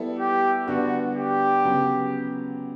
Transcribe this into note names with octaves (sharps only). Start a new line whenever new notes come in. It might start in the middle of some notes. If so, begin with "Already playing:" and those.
Already playing: G3 B3 E4 A4
G4
D3 G3 B3 D4 F#4
G4
C#3 F#3 B3